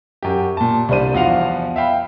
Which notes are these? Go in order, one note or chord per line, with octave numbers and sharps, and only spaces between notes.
F#2 G4
A#2 A5
C2 G3 D4 C5 D#7
E2 F3 F#4 F5 F#5 F7
E5 F5 G5 B5